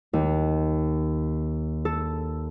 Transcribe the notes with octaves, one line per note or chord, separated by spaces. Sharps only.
D#2
A4